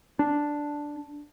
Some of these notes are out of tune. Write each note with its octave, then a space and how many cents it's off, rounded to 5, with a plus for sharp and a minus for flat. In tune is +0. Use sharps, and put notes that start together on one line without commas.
D4 +0